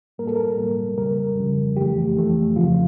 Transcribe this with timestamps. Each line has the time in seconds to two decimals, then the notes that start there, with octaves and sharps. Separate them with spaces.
0.18 A2 G3 A#3 A#4
0.27 A4
0.36 A#4
0.58 A2 G3 A#3
0.98 F2 C#3 G3 A#4
1.38 F2 C#3 G3
1.76 F2 E3 A3 G4
2.17 F2 E3 A3
2.56 F2 C#3 F3 F4